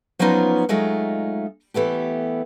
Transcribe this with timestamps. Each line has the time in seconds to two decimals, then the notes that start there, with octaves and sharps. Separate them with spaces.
0.19 F3 F#3 B3 C#4 D#4 F4
0.69 F#3 G#3 A3 D#4 F4
1.74 E3 A3 B3 G4